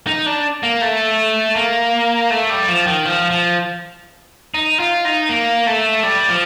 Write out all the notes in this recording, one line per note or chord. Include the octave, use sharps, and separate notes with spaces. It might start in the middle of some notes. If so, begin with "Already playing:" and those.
D#4
D4
A#3
A3
A#3
A3
G3
F3
D#3
F3
F3
D#4
F4
D#4
A#3
A3
G3
F3